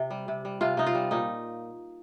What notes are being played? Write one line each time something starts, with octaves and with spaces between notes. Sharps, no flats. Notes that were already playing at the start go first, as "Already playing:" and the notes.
Already playing: C3
G3
C3
G3
C3 F4
C3 D#4
F4
G3
A#2 D#4